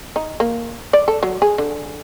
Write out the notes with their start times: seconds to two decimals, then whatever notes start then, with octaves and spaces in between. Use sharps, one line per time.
0.16 D#4
0.40 A#3
0.93 D5
1.08 A4
1.23 F#3
1.42 G#4
1.58 D3